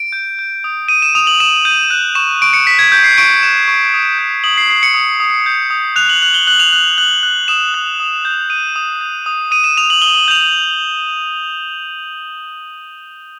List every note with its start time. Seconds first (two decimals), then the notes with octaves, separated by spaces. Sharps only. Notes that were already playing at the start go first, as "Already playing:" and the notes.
Already playing: D7
0.12 G6
0.39 G6
0.64 D#6
0.88 D#6 D#7
1.02 E7
1.15 D#6 F7
1.27 F#7
1.40 D#6 E7
1.65 G6 D#7
1.90 F#6 E7
2.15 C#6 E7
2.42 C#6 D7
2.53 C#7
2.66 F#6 B6
2.79 G#6
2.92 C#6 G6
3.04 C7
3.18 C#6 D7
3.43 F#6 E7
3.68 C#6
3.94 D#6
4.19 G6
4.44 D#6 F#7
4.57 C7
4.70 D#6 C7
4.83 C#7
4.95 D#6
5.20 D#6
5.46 G6
5.70 D#6
5.96 F#6 F7
6.09 F#7
6.22 F#6 F#7
6.34 G7
6.47 F#6 F#7
6.60 F7
6.73 F#6 F#7
6.98 F#6 F#7
7.23 F#6
7.48 D#6 E7
7.74 F#6
8.00 D#6
8.25 G6
8.50 D#6 D#7
8.76 D#6
9.01 G6
9.26 D#6
9.51 D#6 D#7
9.64 E7
9.77 D#6 F7
9.90 F#7
10.02 D#6 G7
10.15 F#7
10.28 G6 F7